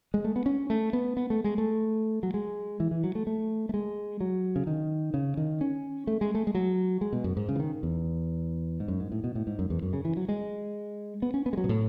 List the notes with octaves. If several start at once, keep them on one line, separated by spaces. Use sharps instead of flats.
G#3
A3
B3
C#4
A3
B3
B3
A3
G#3
A3
F#3
G#3
E3
E3
F#3
A3
A3
A3
G#3
F#3
C#3
D#3
C#3
D#3
C#4
A3
G#3
A3
G#3
F#3
G#3
B2
F#2
G#2
C#3
E3
D#3
E2
G#2
F#2
G#2
A2
B2
A2
G#2
F#2
E2
F#2
C#3
E3
F#3
G#3
B3
C#4
B3
G#3
F#3
B2
A2